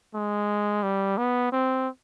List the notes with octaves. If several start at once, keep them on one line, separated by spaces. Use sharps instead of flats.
G#3
G3
B3
C4